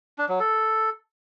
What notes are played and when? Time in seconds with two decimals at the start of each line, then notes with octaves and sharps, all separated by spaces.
0.18 D4
0.29 F#3
0.40 A4